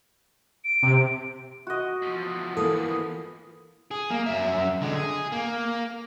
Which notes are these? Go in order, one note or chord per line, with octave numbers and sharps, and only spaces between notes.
D7
C3
F#4 D#5
E2 F3
E3 A#3 A4 D#6
G#4
A#3
F#2 E5
D3 G#3
G#4
A#3